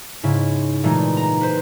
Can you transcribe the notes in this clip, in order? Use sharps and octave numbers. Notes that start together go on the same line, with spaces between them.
G#2 C#3 E4
A#2 E3 G#3 A3 D#4
A#5
B4 C5